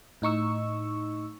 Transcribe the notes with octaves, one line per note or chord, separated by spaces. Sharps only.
A2 D#4 C#6 E6